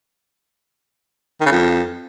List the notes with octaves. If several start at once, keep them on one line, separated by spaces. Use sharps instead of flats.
D#3
C#3
F2